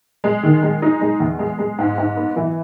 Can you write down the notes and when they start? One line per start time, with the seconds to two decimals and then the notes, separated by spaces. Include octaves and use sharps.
0.24 G#3
0.43 D#3
0.63 G#3
0.82 D#4
1.01 G#3
1.20 E2
1.39 G#3
1.59 G#3
1.79 G#2
1.98 G#2
2.17 B3
2.36 E3